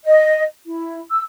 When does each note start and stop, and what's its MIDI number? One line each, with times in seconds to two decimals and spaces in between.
0.05 0.43 75
0.67 1.00 64
1.11 1.22 88